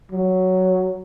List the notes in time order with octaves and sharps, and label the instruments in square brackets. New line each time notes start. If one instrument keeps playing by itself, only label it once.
[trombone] F#3